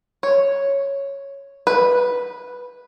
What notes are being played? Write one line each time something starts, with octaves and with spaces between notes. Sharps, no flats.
C#5
B4